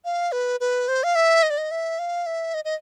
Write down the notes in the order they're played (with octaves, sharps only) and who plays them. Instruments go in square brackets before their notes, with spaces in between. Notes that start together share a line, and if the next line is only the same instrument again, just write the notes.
[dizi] F5
B4
B4
C5
F5
E5
D#5
D5
D#5
E5
F5
E5
D#5
D#5